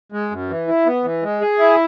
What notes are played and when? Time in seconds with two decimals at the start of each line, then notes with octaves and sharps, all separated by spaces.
0.12 G#3
0.31 F#2
0.49 E3
0.68 E4
0.86 B3
1.04 E3
1.23 G#3
1.41 G#4
1.59 E4